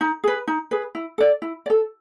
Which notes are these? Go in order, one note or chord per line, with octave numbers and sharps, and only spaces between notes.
D#4
G#4 B4
D#4
G#4 B4
E4
A4 D5
E4
D5
A4